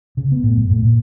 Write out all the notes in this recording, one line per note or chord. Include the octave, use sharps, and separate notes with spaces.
C#3
B3
A2
F#2
A2
A#2